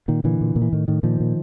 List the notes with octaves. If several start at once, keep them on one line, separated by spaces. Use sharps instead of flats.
A#2 D#3
A#2 D3 E3
A#2
A#2
E3
A2 D#3
A2 D#3
A#2 D#3 F3
A#2